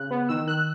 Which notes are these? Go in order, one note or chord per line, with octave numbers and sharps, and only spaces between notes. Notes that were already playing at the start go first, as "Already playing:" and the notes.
Already playing: C#3 F#6
B3
D#3 E6
D#3 F#6